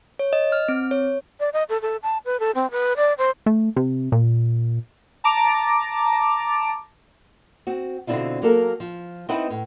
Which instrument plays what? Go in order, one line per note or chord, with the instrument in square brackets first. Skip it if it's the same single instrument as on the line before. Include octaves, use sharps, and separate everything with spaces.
[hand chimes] C#5
D#5
F6
C4
C#5
[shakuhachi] D5
D#5
A4
A4
A5
B4
A4
C4
B4
D5
C5
[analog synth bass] A3
C3
A#2
[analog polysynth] A5 A#5 D6
[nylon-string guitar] C4 F#4
B2 D3 C4 D4 E4 F4
F#3 A#3 A4 A#4
F3
C4 D#4 E4 B4 D#5 F#5
A2